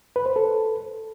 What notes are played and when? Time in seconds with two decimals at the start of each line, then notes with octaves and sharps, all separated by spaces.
0.16 B4
0.26 C5
0.36 A4